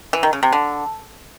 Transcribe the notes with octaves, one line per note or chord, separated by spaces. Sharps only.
E3
D#3
C#3
C3
D3